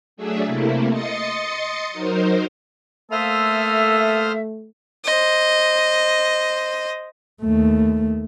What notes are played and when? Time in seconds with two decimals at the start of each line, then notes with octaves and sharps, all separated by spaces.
0.17 F#3 A3 D4 G#4 E5
0.46 C3 A3 A#3 E4
0.91 D#5 C6 D#6 A6 C#7
1.91 F#3 D#4 A#4 C5
3.11 A3 A#3 A4 C5 E5 D#6 F6
5.04 C5 D#5
7.42 D#2 A3